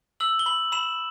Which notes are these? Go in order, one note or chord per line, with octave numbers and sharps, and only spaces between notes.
E6 F#7
G7
B5 F#7
B5 E7